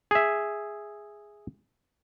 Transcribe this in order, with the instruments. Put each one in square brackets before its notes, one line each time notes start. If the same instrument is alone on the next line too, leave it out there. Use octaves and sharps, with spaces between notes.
[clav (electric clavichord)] G#4 E5